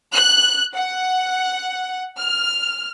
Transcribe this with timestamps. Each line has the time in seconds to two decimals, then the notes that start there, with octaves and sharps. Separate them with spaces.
0.14 F#6
0.75 F#5
2.17 F6